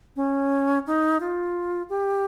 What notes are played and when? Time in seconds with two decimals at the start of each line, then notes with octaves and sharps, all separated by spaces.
0.16 C#4
0.87 D#4
1.20 F4
1.89 G4